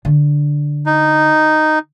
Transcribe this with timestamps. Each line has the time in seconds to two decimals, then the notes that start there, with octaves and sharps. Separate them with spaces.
0.05 D3
0.86 D#4